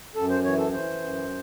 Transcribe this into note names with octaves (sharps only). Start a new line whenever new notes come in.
F#2 A4
C5
E3 C#5
A4
E3 C5
F#2